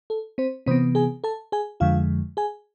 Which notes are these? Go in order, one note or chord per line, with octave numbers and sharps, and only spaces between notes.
A4
C4 C5
C3 E3 B3 C4 C5
G#4 G#5
A4 A5
G#4 G#5
F2 D3 F3 G#3 F4 F5
G#4 G#5